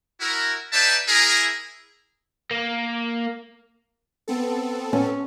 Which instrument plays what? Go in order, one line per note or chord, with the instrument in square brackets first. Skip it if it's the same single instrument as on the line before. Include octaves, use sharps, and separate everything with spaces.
[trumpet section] E4 F#4 A#4
D#4 B4 D5 E5 G5 A5
E4 G#4 A#4
[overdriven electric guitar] A#3
[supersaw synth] B3 C4 A4
[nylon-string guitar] C#4